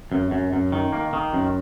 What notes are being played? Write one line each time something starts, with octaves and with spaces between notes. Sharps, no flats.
F#2
F#2
F#2
D#3
A#3
D#3
F#2